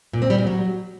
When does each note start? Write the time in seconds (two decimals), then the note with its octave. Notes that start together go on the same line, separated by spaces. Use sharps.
0.13 A#2
0.22 C4
0.30 G3
0.38 A#2
0.47 F#3